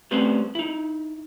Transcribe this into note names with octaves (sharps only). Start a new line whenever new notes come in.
G3 A3 C4 C#4 B4 C5
D#4 E4